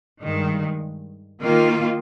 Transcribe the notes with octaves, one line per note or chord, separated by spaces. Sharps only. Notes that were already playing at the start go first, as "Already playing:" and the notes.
G2 D#3 G#3
D#3 A#3 F4